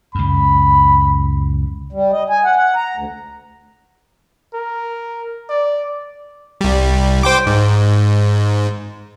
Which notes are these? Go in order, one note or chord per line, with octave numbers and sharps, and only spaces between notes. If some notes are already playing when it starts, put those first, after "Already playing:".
C#2 F#2 B5
G3
D#5
G#5
F#5
F#5
A#5
D2
A#4
D5
C2 G3
C5 G5 D6
G#2